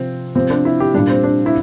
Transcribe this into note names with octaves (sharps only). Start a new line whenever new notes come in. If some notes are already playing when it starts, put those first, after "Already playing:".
Already playing: C3 F3 C4
C3 F3 C4
D4
E4
G4
A#2 G3 D4
C4
D4
E4